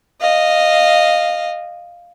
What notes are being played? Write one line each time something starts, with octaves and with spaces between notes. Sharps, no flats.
D#5 F5